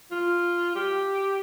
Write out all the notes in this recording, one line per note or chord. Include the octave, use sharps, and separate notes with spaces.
F4
G4